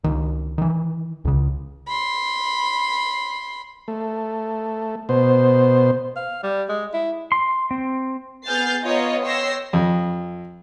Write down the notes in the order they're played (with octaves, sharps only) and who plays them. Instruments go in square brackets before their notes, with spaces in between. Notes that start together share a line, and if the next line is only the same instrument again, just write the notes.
[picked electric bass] C#2 D#3
D#3 E3
C#2 C#3
[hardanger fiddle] B5 C6
[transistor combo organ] A3
B2 C5
[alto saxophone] F5
G3
G#3
E4
[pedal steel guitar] C6
C4
[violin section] B3 G#4 F6 G6 A6 C7
B3 F4 C#5 D#5 F5 A#5
C#5 G5 C6 E6 A#6 C7
[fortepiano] F2